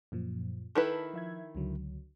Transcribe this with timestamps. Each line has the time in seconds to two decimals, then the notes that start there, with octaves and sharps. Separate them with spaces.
0.12 F#2 A#2 F3
0.75 D#3 E4 A4 B4
1.14 F3 E5 G#6
1.55 C#2 D3 F#3